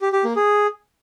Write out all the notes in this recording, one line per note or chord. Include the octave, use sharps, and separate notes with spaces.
G4
G4
A#3
G#4